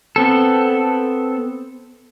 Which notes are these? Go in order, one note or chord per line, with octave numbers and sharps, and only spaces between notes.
B3 C4 A4